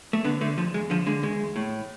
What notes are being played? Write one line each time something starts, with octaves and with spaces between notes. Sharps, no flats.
A3
D3 B3
D3 A3
E2 F3
E2 G#3
D3 F3
D3 G#3
E2 G#3
E2
A2